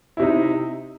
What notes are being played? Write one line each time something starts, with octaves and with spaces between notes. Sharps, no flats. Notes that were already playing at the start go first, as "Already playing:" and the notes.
C3 D#4 E4